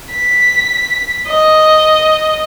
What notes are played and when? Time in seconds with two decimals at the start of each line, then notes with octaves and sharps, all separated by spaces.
0.13 B6
1.28 D#5